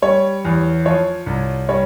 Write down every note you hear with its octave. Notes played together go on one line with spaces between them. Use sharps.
G3 C#5
E2
F3 C#5
C2
G3 C#5